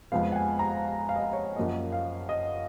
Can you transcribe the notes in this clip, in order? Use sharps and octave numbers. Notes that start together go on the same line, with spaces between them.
F2 F3 G#3 B3 F5
F#5
G#5
A#5
F5
D#5
F5
C#5
F#2 F3 A#3 D#5
F5
D#5